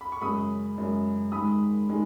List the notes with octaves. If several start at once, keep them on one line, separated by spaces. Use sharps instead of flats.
B5
C#6
F#2 C#3 G#3 B5 D#6
F#2 C#3 G#3
G#2 D#3 G#3 B5 D#6
D#3 G#3